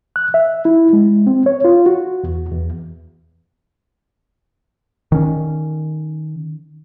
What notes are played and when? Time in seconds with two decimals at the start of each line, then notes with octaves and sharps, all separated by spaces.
0.16 F#6
0.34 E5
0.65 E4
0.93 G#3
1.27 C4
1.46 C#5
1.65 F4
1.86 F#4
2.24 E2
2.52 E2
5.12 D#3 C#4